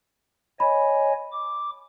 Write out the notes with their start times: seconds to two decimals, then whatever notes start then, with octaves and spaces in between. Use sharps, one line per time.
0.60 C#5 D#5 G#5 B5
1.32 D6